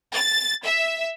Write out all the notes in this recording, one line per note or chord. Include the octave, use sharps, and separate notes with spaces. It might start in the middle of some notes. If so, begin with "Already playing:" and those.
A6
E5